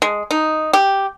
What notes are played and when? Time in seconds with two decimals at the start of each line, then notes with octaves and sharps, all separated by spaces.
0.02 G#3
0.31 D#4
0.73 G4